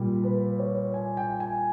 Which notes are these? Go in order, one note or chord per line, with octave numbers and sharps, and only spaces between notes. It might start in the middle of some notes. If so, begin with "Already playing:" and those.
Already playing: A#2 G3
B4
C#5
G#5
G5
G#5